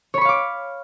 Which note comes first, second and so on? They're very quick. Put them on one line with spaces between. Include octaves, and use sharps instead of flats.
C#5 B5 C#6 F5 D6